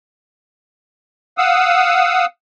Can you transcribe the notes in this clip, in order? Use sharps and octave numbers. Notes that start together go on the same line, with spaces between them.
F5 F#5 D#6 E6